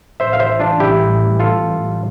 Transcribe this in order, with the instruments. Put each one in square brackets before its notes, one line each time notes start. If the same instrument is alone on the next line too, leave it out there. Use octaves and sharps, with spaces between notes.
[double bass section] A1 A2 E3 G3 [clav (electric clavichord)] C5 E5
[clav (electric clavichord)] F5
C5 E5
D4 F4
E4 G4
F4 A4